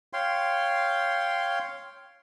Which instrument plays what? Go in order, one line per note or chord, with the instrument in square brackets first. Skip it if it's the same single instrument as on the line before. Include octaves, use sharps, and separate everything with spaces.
[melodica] C#5 F5 G5 C6